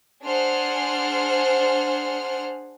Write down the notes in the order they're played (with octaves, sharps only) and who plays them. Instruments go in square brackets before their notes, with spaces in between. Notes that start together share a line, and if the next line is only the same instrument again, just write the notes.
[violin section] D4 G#4 C5 F#5 F6